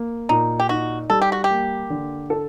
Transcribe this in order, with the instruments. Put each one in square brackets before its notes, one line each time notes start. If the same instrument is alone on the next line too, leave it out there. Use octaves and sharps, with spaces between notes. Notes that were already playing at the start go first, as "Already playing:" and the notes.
Already playing: [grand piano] A#3
[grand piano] A#2 [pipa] D#4
[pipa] G4
[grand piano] D#4 [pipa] F#4
[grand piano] G3 [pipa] A4
[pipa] G4
F#4
G4
[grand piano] A#3
D3
A4